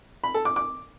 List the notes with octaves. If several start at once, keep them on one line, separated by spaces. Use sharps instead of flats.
B5
A4
D6
D6